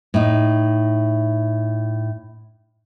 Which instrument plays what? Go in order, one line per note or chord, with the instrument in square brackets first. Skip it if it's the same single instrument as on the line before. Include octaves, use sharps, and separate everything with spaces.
[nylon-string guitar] A2 D#4